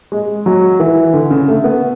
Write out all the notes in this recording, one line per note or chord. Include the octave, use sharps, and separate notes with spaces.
G#3
F#3
E3
D3
C#3
A3
B3